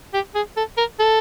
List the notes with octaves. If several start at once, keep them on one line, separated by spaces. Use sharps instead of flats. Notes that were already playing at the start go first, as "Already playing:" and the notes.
G4
G#4
A4
A#4
A4